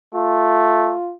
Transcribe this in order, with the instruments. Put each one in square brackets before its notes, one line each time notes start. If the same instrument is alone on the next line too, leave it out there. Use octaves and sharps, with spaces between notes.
[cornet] A3 [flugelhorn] F4